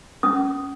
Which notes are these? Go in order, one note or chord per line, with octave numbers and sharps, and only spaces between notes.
C#4 D#6